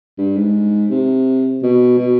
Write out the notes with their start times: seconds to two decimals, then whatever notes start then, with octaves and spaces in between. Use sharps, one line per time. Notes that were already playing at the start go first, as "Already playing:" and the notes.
0.18 G2
0.36 G#2
0.90 C3
1.63 B2
1.99 B2